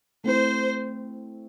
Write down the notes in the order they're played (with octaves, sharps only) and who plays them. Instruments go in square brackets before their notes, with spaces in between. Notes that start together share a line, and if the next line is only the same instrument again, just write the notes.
[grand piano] A3 C4 E4 [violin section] C5